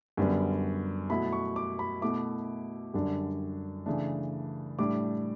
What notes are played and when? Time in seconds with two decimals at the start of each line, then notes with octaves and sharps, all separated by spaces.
0.17 F#2 D3 G3 B3
1.10 B2 F#3 A3 E4 B5
1.32 C#6
1.56 D6
1.79 B5
2.02 B2 A3 E4 D6
2.94 F#2 D3 G3 D4
3.86 C#3 E3 A3 D4
4.79 A2 G3 D4 D6